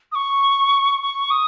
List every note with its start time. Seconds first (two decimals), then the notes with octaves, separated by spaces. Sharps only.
0.12 D#6
0.15 C#6
1.02 C#6
1.31 D#6